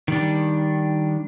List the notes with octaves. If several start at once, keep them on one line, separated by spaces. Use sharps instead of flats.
D#3 G3 D4